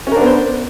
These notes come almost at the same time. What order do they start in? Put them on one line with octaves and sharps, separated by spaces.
C#4 A#4 D4 B3 C5